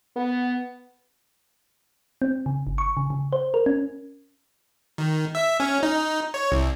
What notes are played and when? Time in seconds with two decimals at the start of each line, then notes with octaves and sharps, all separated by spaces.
0.16 B3
2.22 C4
2.46 C#3
2.67 G1
2.78 C#6
2.97 C#3
3.10 C#3
3.33 C5
3.54 A#4
3.66 C#4
4.98 D#3
5.35 E5
5.60 C#4
5.83 D#4
6.34 C#5
6.52 C2